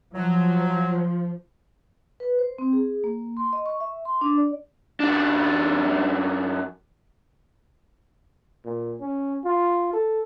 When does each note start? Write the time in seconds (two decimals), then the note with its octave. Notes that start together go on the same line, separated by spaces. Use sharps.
0.14 F3 F#3
2.20 B4
2.39 C5
2.58 C4
2.73 G#4
3.04 A#3
3.37 C6
3.53 D#5
3.66 C#6
3.81 E5
4.05 C6
4.21 D4
4.37 D5
5.00 F#2 D4
8.65 A#2
9.01 C#4
9.44 F4
9.93 A4